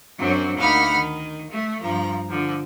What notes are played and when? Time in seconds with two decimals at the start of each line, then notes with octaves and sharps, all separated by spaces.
0.19 F#2 F#3 C4 D4
0.57 D2 A#3 D#4 F#5 B5 F6
0.97 D#3
1.50 A3
1.81 G2 F3 A#5
2.29 D3 F3